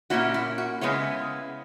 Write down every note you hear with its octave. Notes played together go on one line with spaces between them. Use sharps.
A#2 A#3 C#4 E4 F#4
E4
F#4
C#3 G#3 B3 E4 C#5